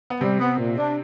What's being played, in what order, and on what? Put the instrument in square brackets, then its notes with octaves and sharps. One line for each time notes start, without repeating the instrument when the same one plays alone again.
[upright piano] B3
[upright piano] C3 C4 [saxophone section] G3
[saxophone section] B3
A#2
D4